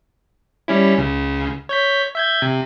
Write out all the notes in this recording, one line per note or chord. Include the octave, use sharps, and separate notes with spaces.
G3 C#4 E4
C#2 C#3
C#5 G6 B6
E5 G6 G#6
C3